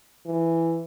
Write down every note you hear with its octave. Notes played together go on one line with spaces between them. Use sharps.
E3